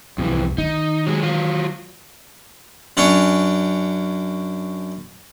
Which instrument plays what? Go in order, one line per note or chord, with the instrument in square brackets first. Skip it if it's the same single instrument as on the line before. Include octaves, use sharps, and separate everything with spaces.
[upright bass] C2 G#2 [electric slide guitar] F2 E3
[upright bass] D#3 [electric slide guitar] D#4
[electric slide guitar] F#3 G#3
F#3 F4
[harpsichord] F#2 C#4 D4 C#5